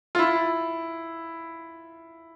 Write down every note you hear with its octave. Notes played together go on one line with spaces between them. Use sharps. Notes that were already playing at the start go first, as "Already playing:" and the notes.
F4
E4